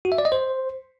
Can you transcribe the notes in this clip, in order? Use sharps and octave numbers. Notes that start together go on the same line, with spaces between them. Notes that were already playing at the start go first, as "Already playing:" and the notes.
F#4
E5
D5
D#5
C5